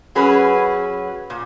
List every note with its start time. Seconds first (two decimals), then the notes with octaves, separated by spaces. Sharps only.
0.15 F#3 C#4 G#4 B4
1.30 A#2